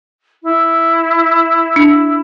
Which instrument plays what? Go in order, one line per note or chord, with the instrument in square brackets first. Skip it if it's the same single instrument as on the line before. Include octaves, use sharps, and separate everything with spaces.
[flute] E4
[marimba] D4